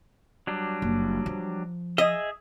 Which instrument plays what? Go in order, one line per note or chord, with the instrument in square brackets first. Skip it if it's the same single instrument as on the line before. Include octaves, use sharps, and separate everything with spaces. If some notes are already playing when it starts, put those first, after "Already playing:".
[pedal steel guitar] F#3 G3 D4
[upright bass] F#1
F3
[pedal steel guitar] G#4 E5 [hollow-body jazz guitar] D#5